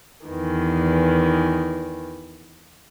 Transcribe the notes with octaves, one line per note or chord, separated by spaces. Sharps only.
E2 D#3 E3